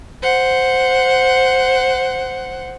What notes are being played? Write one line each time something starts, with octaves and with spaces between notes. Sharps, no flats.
C5 F#5